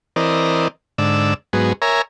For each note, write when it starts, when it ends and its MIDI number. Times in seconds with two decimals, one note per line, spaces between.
0.16 0.68 52
0.16 0.68 60
0.16 0.68 70
0.16 0.68 74
0.16 0.68 75
0.98 1.34 44
0.98 1.34 50
0.98 1.34 74
0.98 1.34 88
1.53 1.73 44
1.53 1.73 54
1.53 1.73 59
1.53 1.73 68
1.82 2.02 70
1.82 2.02 73
1.82 2.02 76
1.82 2.02 80
1.82 2.02 82